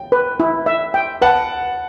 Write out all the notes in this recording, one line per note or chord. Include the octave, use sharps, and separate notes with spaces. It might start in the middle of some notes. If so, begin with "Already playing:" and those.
Already playing: G5
B4
E4
E5
G5
B4 F#5 A5